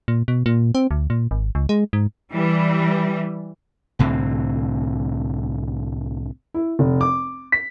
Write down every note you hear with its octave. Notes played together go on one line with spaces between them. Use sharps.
A#2
B2
A#2
C4
D2
A#2
G#1
C#2
G#3
G#2
E3 G3
C2 A2 D3 C4
E4
F1
D6
B6